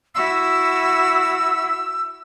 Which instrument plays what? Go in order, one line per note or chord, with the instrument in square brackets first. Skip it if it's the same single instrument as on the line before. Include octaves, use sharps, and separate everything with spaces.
[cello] E4 F#4 [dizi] E6